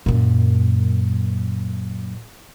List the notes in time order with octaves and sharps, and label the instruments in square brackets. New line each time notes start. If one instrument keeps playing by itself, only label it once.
[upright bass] F#2 A#2